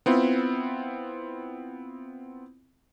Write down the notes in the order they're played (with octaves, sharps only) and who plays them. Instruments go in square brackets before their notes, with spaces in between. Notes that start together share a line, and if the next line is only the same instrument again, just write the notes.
[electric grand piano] B3 C4 E4 F4